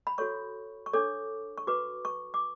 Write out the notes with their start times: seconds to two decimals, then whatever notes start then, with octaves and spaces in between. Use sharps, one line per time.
0.07 B5
0.18 F#4 A4 C#5 C#6
0.86 C#6
0.93 D4 A4 C#5 D6
1.58 C#6
1.67 F#4 B4 D6
2.05 C#6
2.34 D6